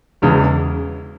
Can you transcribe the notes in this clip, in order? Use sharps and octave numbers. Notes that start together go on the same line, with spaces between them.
E1 E2 C#3